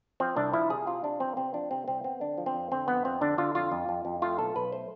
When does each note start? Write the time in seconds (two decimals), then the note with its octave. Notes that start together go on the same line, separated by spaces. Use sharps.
0.20 F3 C4
0.36 C2 D4
0.53 F3 E4
0.70 C3 G#4
0.87 C3 F4
1.04 C3 D4
1.20 F3 C4
1.37 C3 C4
1.54 F3 D4
1.71 C3 C4
1.88 C2 C4
2.04 B3 C4
2.21 D3 D4
2.38 F3
2.46 C4
2.55 F2
2.71 D3 C4
2.88 F2 B3
3.05 F2 C4
3.21 D3 D4
3.38 D3 F4
3.55 F2 F4
3.72 F2
3.89 F2
4.05 F2
4.22 A3 F4
4.39 B1 A4
4.56 B1 B4
4.72 A3 C5